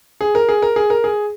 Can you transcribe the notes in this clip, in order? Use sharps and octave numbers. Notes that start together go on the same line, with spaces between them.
G#4
A#4
G#4
A#4
G#4
A#4
G#4